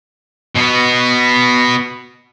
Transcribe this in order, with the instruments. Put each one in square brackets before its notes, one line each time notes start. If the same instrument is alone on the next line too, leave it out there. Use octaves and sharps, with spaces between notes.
[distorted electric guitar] B2 B3